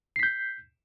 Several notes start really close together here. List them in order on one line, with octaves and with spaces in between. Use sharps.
C7 B6 G6